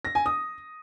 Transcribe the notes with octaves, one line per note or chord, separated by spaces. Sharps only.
A#6
G#5
D#6